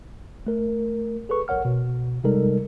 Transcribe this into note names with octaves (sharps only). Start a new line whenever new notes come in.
A3 A#4
G#4 A4 B4 C#6
A#1 A#4 C#5 F#5 F6
B2
C3 G3 G#3 D#4 A4 A#4